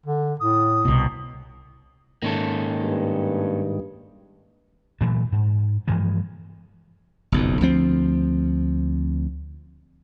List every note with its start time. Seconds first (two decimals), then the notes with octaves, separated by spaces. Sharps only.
0.06 D3
0.40 A2 D#6
0.85 C2 B2
2.22 G#2 D#3 A#3 C#4 A4
2.84 G2
5.01 A#2 E3 F#3 A3
5.32 G#2
5.88 G2 E3 F3 G#3
7.32 F#1 B1 F2
7.61 D2 F3 C4